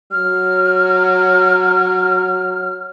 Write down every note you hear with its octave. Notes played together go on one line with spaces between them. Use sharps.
F#3 F6